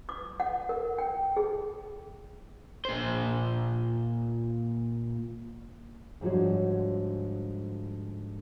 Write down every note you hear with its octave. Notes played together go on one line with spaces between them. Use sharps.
D6
F#5
A#4
G5
G#4
A#2 C5
G#2 D3 F3 G3 F#4 C#5